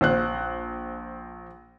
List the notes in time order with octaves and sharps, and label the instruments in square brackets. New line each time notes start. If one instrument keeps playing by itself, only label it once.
[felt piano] A#1 C5 F#6